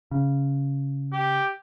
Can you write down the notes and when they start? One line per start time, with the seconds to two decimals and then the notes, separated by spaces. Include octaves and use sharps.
0.11 C#3
1.13 G4